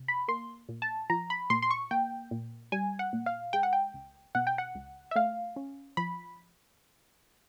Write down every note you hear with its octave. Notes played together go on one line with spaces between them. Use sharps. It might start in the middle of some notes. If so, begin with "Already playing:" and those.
Already playing: C3
B5
A#3 C6
A#2
A5
F3 A#5
B5
A#2 C6
C6
C#6
A#3 G5
A#2
G3 G#5
F#5
A#2
F5
G#3 G5
F#5
G5
C#2
B2 F#5
G5
F#5
C#2
E5
A3 F5
C#4
F3 B5